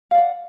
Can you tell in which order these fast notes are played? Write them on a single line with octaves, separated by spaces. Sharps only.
F5 D5 F#5